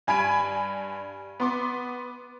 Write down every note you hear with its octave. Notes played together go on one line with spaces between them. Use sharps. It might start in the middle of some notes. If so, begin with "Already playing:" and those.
G2 G#5 B5 G#6 D7 D#7
B3 C6 D6